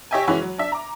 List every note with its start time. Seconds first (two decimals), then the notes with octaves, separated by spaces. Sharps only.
0.11 G4 C#5 D#5 E5 G5 G#5
0.27 E3 G#3 C#4 E4 F#4
0.42 F#3
0.58 D4 E5
0.72 A#5 D6